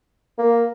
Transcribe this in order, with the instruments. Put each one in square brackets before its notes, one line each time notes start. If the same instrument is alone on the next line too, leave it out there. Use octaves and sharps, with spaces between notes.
[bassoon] A#3